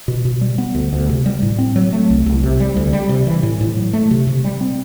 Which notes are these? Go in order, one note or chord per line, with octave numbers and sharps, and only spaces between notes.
B2
B2
G3
B3
D2
D2
C3
G3
A2
C4
F#3
A3
C2
C2
C3
G3
D2
G3
C3
E3
A2
A2
F#3
A3
C3
C3
G3
C4